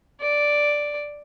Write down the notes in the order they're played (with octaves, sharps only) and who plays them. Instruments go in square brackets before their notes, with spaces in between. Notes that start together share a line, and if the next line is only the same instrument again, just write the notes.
[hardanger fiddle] D5